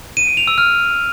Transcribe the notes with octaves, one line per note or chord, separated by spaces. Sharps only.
D#7
D7
F7
E6
F6